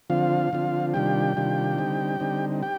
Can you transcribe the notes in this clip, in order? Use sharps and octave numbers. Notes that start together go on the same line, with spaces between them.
D3 F3 C4 F4 F5
D3 F3 C4 F4
C3 D#3 G3 D4 F4 G4 G5
C3 D#3 G3 D4 F4
D3 G3 C4 D#4
D3 G3 C4 D#4
G4 G5